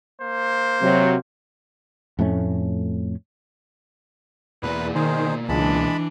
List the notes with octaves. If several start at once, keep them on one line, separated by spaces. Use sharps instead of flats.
A#3 C5
C3 F#3
F2 A2 A3 C#4
E2 B2 A#3 B4 D5
D#3 G#4 C5
C#2 E3 G#3 D4 A5 B5